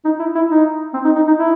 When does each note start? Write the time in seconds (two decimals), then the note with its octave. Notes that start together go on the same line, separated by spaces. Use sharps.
0.05 D#4
0.19 E4
0.35 E4
0.50 D#4
0.94 C4
1.05 D#4
1.16 D#4
1.28 D#4
1.38 E4